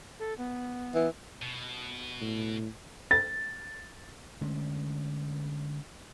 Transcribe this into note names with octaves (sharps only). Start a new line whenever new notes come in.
A4
B3
E3
B2
A2
A6
D3 G#3 A3 C#4